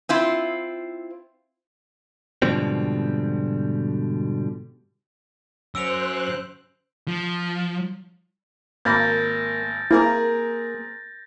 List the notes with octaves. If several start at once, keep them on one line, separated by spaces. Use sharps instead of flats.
C4 E4 F4
G#2 B2 D3 F3 G3 C4
F#3 C#4 C5 E6 F#6 D7 F7
F3
G#1 A#3 B5 G6 A6 A#6
A#3 C4 E4 G#4 A#4